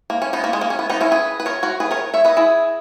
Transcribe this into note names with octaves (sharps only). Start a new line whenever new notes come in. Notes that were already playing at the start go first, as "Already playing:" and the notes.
A#3
C#4
B3 D#4
A#3
G#3
A#3
C#4
B3
B3 D#4
C#4 E4
G#4 B4
B4
A#4 C#5
F#4 A#4
G#4 B4
A#4 C#5
C#5 E5
B4 D#5
E4 G#4